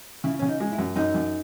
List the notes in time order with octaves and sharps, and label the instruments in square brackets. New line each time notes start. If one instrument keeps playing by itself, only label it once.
[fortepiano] C#3 [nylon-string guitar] E4
[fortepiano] C#3 [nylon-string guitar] C#4
[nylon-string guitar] D#4
[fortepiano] G#3
[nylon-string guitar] E4
[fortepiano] F#2
[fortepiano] F#2 [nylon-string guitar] D#4
[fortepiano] F#2